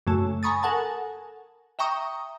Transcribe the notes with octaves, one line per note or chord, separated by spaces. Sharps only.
F#2 C#3 A3
G#5 A#5 B5 C#6 D#6 A6
A4 A#4 F#5 G#5 A5
E5 G5 A#5 C#6 D#6